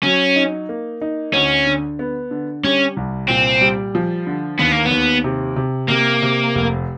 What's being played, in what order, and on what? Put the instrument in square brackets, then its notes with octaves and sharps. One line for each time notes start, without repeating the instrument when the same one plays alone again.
[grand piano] F#3 [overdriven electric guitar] C#4
[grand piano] D#4
A#3
D#4
[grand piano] D2 [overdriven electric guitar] C#4
[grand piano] D3
B3
D3
[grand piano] G3 [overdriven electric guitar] C#4
[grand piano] C2
[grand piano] A#2 [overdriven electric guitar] C4
[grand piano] G3
F3
D3
[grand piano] D#2 [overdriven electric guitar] B3
[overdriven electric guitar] A#3
B3
[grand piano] D#2
C3
C3
[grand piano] C3 [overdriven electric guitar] A#3
[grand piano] C3
F1